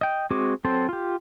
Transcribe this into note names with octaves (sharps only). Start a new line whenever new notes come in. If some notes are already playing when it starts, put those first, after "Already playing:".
D#5 G5
G#3 C4 F#4 G#4 D6
F#3 C4 A4 C5
F4 G4